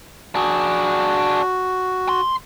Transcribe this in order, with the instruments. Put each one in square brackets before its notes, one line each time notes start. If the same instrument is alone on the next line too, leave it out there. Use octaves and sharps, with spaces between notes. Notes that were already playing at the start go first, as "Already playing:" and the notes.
[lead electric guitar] D4 G#4 [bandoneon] F#4
[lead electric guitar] C6